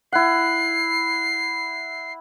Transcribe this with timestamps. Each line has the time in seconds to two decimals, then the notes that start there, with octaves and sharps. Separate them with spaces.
0.13 E4 F#5 C7